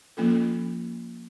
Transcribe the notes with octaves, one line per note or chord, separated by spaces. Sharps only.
F3 A#3 C#4 F4 A4